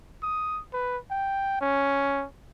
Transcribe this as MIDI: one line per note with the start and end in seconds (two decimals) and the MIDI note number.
0.23 0.61 87
0.73 0.97 71
1.11 1.60 79
1.61 2.25 61